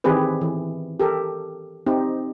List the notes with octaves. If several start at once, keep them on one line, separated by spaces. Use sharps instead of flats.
D#3 E3 C4 G4 G#4 B4
E3
G4 A4 A#4
C4 D#4 G4